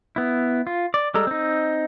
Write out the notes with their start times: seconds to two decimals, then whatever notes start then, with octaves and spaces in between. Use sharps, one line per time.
0.16 B3 E4
0.67 F4
0.94 D5
1.14 G3 G#3 A4 A#5
1.27 C4 D#4